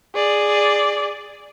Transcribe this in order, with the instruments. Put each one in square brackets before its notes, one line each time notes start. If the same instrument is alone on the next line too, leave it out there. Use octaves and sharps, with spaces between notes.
[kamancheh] G#4 D5